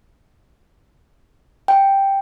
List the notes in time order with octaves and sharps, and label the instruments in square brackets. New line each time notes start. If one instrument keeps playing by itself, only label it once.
[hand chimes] G5